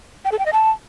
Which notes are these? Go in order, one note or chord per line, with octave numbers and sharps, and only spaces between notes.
G5
A4
G5
D#5
A5